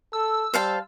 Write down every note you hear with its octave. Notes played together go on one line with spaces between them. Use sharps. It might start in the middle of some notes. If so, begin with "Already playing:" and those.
A4 E6
G3 C5 F5 A5